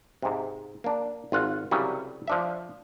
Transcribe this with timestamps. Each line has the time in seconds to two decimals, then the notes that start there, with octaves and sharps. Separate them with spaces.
0.22 G#2 C3
0.84 A#3 D4
1.32 G#1 F4 F#5
1.71 C2 C#3 F#3 G3
2.28 F3 D4 E5